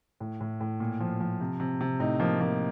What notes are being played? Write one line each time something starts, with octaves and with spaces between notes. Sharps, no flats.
A2
A2
A2
A#2
F3
F3
C3
C3
C3
A2 D#4
F3 A#3
F3 A#3